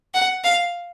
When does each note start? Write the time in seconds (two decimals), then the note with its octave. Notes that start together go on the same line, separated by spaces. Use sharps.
0.14 F#5
0.44 F5